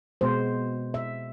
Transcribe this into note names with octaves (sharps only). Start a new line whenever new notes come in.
B2 G#3 B3 C5
E5